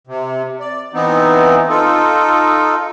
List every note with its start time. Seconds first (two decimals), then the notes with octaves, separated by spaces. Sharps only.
0.07 C3
0.60 D5
0.94 E3 B3 C4 D#4
1.69 D#4 F4 A4